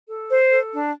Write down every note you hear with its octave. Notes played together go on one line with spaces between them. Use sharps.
A4
C5
A4
D4